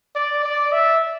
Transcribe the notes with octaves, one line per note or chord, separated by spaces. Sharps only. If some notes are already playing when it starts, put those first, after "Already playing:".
D5
D5
E5